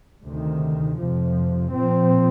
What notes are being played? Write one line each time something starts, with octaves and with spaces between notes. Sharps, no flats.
D2 C3 D#3
F2 C3 F3
A#2 F3 C4